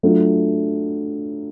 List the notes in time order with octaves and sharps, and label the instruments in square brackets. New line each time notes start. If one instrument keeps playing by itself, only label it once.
[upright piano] F#3 A3 D4 F4